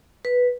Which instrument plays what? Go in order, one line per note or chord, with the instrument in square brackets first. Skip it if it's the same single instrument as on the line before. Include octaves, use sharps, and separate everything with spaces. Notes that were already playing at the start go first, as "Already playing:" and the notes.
[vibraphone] B4